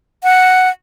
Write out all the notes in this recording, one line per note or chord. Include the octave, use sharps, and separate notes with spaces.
F#5